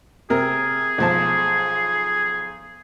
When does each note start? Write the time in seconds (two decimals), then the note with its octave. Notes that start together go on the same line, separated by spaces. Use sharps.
0.30 C3 G#4 A#4
0.98 B1 F3 A5